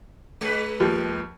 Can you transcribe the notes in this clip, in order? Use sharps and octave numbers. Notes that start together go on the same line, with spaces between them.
G#3 B4
D#2 F3 G4